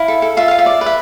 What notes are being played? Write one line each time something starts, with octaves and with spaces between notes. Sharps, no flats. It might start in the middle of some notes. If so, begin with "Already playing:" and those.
Already playing: E4 F5
A4
A4
F4 E5
F4 F5
E5
D5
B4
E5